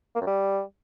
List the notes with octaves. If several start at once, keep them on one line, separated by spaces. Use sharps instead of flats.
A#3
F#2
G3